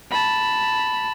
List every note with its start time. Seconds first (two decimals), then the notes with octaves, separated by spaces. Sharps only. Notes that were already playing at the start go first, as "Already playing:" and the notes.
0.11 A5 B5